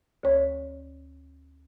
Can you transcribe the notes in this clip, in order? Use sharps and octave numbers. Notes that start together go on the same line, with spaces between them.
D2 C#5